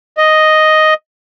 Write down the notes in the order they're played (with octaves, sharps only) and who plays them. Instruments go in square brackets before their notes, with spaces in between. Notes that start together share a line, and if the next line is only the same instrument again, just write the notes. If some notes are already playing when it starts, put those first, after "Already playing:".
[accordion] D#5